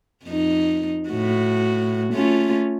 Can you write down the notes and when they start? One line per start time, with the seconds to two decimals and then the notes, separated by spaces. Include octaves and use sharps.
0.25 F2 D#4
1.09 A2 F#4
2.14 A3 C#4 F4